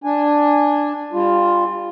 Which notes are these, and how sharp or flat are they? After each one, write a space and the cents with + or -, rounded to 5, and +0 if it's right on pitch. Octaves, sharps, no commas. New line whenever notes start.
D4 +0 G#5 -10
G3 +25 F4 +0